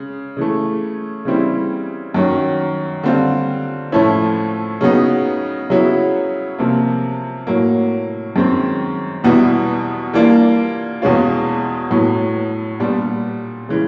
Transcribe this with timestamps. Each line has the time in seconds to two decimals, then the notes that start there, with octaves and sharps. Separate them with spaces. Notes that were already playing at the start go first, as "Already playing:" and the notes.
Already playing: C#3 G#3
0.37 C#3 E3 A3
1.25 C#3 E3 G3 C4 E4
2.14 F#2 D#3 F#3
3.03 D3 G3 C4 F4
3.92 A2 F3 A3 C#4 E4
4.81 C#3 F#3 B3 D#4
5.70 C#3 F#3 B3 E4
6.58 C3 F3 A#3
7.47 A2 F#3 A#3
8.36 F#2 D#3 G#3 C4
9.24 E2 B2 G3 B3 E4
10.13 E3 G3 A#3 D4 F4
11.02 E2 B2 G#3 C#4 F4
11.90 A2 F#3 B3
12.80 A#2 G3 B3 D4
13.69 C#3 E3 G#3